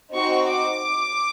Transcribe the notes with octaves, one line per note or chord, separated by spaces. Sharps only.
C4 D#4 F#4 C#6
D6